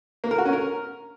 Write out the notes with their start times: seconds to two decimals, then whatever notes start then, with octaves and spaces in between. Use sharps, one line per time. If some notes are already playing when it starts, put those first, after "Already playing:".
0.24 A#3
0.31 A#4
0.38 F#4
0.46 C#4
0.53 A#4